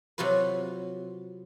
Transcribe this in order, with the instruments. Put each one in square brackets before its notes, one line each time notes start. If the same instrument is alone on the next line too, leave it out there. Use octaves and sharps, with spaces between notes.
[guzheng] C3 F#3 F4 F#4 B4